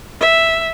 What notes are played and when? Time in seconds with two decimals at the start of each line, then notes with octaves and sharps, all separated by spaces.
0.21 E5